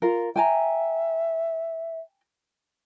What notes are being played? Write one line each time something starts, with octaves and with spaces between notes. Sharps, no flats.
F4 A#4
E5 G5 G#5 A#5